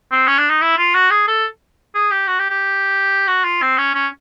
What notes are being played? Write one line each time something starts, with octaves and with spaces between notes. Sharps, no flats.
C4
C#4
D4
D#4
E4
F4
F#4
G#4
A4
G#4
G4
F#4
G4
G4
F#4
F4
C4
C#4
C#4